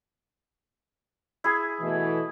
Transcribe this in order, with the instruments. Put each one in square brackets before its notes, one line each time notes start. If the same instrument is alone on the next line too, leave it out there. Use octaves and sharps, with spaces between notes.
[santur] E4 G#4
[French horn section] B2 E3 A3